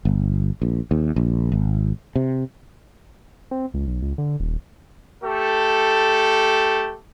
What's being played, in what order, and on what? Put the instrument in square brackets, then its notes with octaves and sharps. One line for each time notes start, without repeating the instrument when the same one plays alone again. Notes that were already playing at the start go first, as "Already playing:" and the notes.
[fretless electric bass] G1
A#1
D#2
A#1
G#1
C3
[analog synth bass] C4
C#2
B1
C#2
D3
D#1
[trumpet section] A3 G4 A4